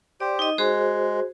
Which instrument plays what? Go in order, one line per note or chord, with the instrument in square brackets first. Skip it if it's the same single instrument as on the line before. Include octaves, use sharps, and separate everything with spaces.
[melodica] G4 C5 [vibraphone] D5
[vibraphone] D#4 D#5
[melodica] G#3 [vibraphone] F#4 G#4 C5